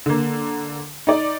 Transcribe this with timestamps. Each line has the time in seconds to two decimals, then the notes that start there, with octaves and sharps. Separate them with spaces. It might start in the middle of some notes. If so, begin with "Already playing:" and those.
0.06 D3 A#3
1.07 D#4 D5